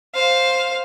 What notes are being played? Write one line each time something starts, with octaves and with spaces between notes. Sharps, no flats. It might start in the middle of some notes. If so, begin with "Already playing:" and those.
C5 F5